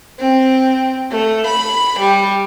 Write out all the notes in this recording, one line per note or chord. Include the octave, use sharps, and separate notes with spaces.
C4
A3
B5
G3